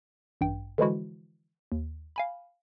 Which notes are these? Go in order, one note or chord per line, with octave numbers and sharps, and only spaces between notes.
A1 G2 G5
D3 E3 F3 G#3 E4 F#4
D#2
F5 G#5 B5